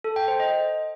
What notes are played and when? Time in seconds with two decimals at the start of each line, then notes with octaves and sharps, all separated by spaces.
0.04 A4
0.16 G5
0.28 C5
0.40 D#5